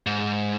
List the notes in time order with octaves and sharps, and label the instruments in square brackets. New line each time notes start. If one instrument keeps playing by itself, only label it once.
[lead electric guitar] G#2